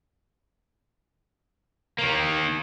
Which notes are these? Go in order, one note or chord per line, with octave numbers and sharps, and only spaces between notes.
D#3 A#3